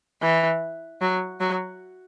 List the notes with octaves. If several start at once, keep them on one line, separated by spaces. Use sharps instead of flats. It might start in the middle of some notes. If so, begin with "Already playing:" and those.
E3
F#3
F#3